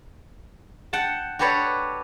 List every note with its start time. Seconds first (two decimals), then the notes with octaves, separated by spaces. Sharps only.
0.93 F#5 G5 A5
1.39 F#4 G4 A4 B4 C#5 D5